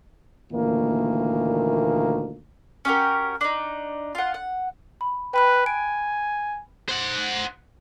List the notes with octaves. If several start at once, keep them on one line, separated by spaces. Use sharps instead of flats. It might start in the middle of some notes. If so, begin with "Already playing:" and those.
D2 A#2 D#3 E3 A#3
C#4 F#4 G4 A#4
D4 D#4
F4 F#5
F#5
B5
B4 G5 B5 F#6
G#5 D7
C5 F#5